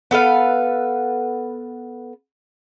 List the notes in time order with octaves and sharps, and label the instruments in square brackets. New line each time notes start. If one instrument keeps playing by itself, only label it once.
[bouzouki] B3 A4 B4 F5